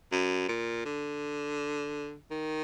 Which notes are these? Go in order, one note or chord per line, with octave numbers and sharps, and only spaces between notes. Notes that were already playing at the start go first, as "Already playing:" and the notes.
F#2
A#2
D3
D#3